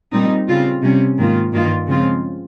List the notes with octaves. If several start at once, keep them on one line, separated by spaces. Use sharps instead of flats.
A#2 G3 C4 D#4
C#3 G3 C4 F4
C3 G3 C#4
G#2 D#3 A#3 F4
G2 D#3 A#3 F4
C#3 F3 G#3 C4 F4